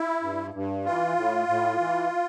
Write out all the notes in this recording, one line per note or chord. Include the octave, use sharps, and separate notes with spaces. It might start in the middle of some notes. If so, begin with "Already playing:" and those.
Already playing: E4
G2
G2
E3 F4
A2
A2
E3